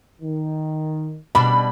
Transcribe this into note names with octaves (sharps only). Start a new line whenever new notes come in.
D#3
B2 G3 D4 B5